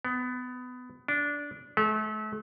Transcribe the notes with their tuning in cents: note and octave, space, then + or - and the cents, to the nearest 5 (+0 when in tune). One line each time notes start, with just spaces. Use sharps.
B3 +20
D4 -15
A3 -40